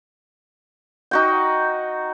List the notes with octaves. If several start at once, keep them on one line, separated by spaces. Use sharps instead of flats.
D#4 F#4 G5